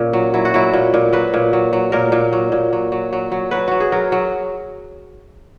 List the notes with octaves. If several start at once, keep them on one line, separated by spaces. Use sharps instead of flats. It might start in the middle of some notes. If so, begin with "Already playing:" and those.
Already playing: A#2 C#4
F#3
F#3 E4
F#4
F#3 E4
A#2
A#2
F#3 B4
A#2
F#3
F#3
A#2 A#4
A#2
F#3
A#2
F#3
F#3
F#3
F#3
F#3 B4
F#3 F#4
G#4
F#3 A#4
F#3